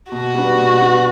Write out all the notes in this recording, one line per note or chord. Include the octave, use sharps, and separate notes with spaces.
B2 F#4
G3 B3 D4
B2
G3 B3 D4